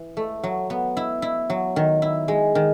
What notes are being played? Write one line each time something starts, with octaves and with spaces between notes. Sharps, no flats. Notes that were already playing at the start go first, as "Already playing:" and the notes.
Already playing: E3
A3
F#3
B3
E4
E4
F#3
D#3
E4
G#3
D#3